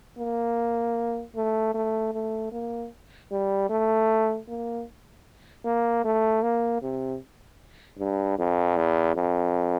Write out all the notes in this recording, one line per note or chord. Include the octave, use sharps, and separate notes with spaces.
A#3
A3
A3
A3
A#3
G3
A3
A#3
A#3
A3
A#3
C3
G2
F2
E2
F2